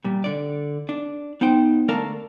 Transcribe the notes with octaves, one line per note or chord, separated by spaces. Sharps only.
A#2 G3
D3 D5
D4
B3 D#4 C5 G5
D3 A3 A#4 D5 F5 A5